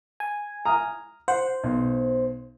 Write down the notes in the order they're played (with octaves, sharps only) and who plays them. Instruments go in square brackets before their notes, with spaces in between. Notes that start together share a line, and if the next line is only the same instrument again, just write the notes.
[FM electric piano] G#5
[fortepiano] A#5 D#6 F6
[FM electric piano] C5 [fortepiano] F#5
[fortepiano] B1